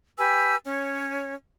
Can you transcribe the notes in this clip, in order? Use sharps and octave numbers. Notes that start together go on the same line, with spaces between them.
G4 B4 G#5 E6
C#4 C#5